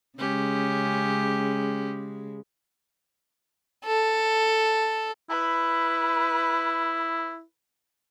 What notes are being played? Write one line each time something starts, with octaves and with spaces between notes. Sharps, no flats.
C#3 G#3 C#4 G4
A4
E4 B4